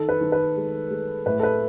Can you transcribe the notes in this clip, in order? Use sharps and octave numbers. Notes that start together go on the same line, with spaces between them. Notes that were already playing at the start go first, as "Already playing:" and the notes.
Already playing: D#3 A4
B4
D#3
B4
G#3
G#3
A2 B4
A4
B4